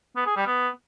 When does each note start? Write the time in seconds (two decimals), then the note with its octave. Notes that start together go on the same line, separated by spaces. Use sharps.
0.16 B3
0.26 G#4
0.36 G3
0.46 B3